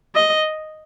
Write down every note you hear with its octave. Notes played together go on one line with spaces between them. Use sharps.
D#5